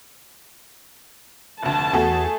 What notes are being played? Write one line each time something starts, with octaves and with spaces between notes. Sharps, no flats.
F1 D2 A5
E2 A3 F#4 G#4 A4